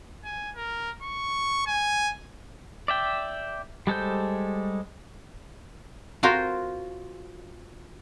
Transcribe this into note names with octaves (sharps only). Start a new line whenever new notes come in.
G#5
A#4
C#6
G#5
D5 E5 G5
G3 G#3 A4 C5 G6
F4 F#4 A#4 C5